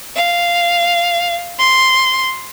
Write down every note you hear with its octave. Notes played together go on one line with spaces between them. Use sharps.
F5
C6